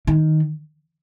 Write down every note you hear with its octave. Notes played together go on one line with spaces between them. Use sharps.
D#3